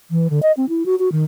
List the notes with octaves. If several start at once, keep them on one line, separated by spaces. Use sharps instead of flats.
E3
D3
D#5
C4
E4
F#4
F#4
D#3